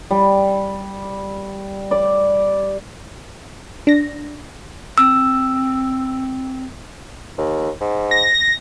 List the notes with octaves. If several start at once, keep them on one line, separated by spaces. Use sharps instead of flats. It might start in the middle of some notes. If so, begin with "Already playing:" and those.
G3
D5
D4 A#6
C4 E6
D#2
G#2
A#6